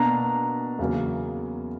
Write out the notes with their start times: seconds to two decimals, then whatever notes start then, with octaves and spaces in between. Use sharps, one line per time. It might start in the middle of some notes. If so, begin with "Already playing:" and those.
Already playing: B2 A#3 D4 A#5
0.79 E2 C#3 F#3 A#3